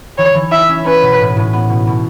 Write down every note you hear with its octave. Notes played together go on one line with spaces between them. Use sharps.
E3 C#5
E3
E4 E5
C#4
C#4 B4
B2
A2
A2
B3
B2
B2